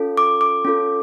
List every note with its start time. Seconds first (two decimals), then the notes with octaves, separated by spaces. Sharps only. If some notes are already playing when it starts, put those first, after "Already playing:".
Already playing: C#4 F4 A4
0.18 D6
0.41 D6
0.65 C#4 F4 A4